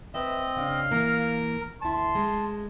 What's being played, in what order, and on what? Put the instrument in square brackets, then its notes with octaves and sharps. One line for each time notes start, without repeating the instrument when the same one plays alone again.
[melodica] C4 D#5 [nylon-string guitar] B4 E5
[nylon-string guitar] C#3 D4 [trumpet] F5
[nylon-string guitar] E3 A#3 [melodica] A#4
[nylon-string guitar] D2 E4 [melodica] A5 [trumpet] C6
[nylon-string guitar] G#3